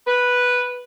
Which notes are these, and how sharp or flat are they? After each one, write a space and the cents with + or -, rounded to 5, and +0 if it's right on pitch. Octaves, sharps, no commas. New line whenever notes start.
B4 -5